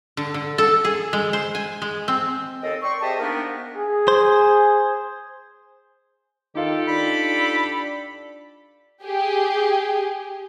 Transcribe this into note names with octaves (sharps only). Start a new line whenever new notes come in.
D3
D3
A4
G#4
G#3
C5
G#5
G#3
C4
D#2 C4 A4 D#5
D5 G5 C6 C#6
G4 G#4 C5 D#5 E5 A5
A#3 B3 D4 D#4 A#4
G#4
C5
D#3 D#4 F4 G4 A4 F5
D4 B5
G4 G#4